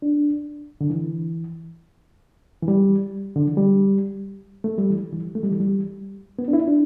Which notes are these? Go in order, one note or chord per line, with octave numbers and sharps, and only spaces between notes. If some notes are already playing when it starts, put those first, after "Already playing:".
D4
D3
E3
E3
G3
D3
E3
G3
A3
G3
E3
E3
A3
G3
E3
G3
B3
D4
E4
D4